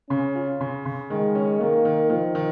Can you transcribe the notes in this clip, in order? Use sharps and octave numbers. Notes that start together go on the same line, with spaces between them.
C#3 C#4
F4
C#3
C#3
D#3 G#3
C#4
D#3 A#3
D#3
D#3 F3
D#3